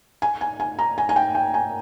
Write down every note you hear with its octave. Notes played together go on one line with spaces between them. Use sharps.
G#5
G#5
G#5
A#5
G#5
G#5
G5
G5
G#5